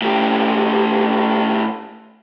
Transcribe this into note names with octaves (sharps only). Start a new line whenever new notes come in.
A2 G4